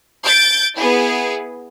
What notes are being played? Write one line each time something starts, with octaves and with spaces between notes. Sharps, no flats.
G6 A6 D7
B3 E4 G#4